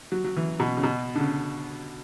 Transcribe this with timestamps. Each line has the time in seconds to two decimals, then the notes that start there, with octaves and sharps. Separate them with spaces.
0.12 F#3
0.24 F#3
0.36 E3
0.60 B2
0.77 C#3
0.83 B2
1.15 D3
1.20 C#3